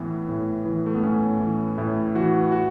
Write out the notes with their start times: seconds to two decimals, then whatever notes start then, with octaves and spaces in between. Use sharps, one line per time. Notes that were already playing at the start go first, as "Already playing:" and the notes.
Already playing: A2 E3 B3
0.29 A2
0.65 E3
0.86 A3
0.95 B3
1.03 A2 C#4
1.40 E3
1.78 A2 E4
2.15 E3 F#4
2.52 F#4